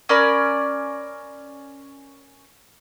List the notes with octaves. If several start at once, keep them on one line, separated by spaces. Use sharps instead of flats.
C#4 A#4 D5 B5